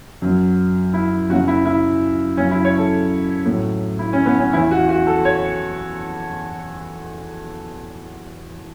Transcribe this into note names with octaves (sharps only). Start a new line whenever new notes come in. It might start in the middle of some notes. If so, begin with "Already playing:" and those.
F#2 F#3
E4
F#2 C#3 F#3 F#4
E4
E4
F#2 C#3 F#3 C#4
E4
C#5
A4
A2 F#3
E4
C#4
B3
C#4
E2 E3 E4
F#4
F#4
A4
C#5